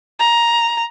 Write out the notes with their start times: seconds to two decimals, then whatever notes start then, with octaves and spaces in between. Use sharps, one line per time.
0.19 A#5